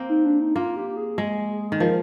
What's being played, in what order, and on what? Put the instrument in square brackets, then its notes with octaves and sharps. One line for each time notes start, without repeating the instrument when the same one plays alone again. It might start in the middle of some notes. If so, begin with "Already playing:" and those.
Already playing: [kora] A#3 C4
[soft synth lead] D#4
D4
D#4
[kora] A#3 [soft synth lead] F4
[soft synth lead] G4
G#4
[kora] G#3
D#3
[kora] F3 [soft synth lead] A#4